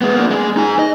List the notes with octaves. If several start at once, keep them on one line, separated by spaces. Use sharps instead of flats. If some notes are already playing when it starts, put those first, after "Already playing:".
G#3 B3
A#3 D4
G#3 G#4
D#4 G#5
D#5